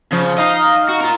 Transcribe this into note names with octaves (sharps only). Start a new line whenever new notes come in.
C#3 F3
D#4 D#5 F5
F#4
F4 A#4